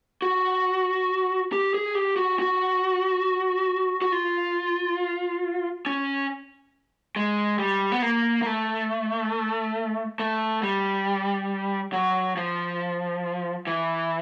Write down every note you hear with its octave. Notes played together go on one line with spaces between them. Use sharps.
F#4
G4
G#4
G4
F#4
F#4
F#4
F4
C#4
G#3
G3
B3
A#3
A#3
A3
A3
G3
F#3
F3
E3